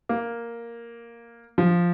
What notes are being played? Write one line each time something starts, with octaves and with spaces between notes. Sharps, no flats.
A#3
F3